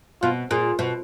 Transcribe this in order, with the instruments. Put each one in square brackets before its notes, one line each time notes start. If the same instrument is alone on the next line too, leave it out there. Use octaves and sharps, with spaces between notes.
[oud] B2 [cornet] F4
[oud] A#2 [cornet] G#4
[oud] B2